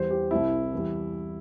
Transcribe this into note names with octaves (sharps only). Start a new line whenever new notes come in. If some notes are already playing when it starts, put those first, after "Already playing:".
Already playing: E2 E3 G3 C5
G4
C2 C3 G3 E4
E2 E3 G3